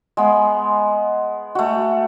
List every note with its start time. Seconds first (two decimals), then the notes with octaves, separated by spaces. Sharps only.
0.17 G#3 B3
1.55 A3 F#4